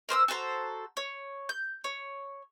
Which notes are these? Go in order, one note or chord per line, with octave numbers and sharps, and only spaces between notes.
A#4 C5 D#6 E6
F#4 A4 C5 A#5
C#5
G6
C#5